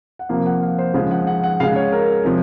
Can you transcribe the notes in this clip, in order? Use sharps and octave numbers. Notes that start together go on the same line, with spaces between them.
F#5
C3 F3 A#3 F5
F#5
F5
C5
C#3 F3 G#3 F5
F#5
F#5
F#5
C#3 G#3 F5
C#5
A#4
C3 F3 G#3